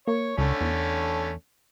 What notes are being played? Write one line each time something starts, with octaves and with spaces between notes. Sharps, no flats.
A#3 C#5
C#2 D3 A3 C#4
E2